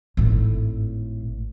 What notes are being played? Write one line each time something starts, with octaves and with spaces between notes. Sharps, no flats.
G#1 A2